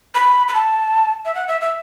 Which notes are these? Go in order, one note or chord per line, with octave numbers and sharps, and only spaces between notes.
B5
B5
A5
E5
F#5
E5
E5